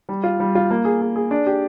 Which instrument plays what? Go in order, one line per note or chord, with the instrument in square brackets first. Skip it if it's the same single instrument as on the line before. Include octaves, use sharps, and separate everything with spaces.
[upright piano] G3
F4
G3
F4
A#3
G#4
G#4
G#4
D4
G4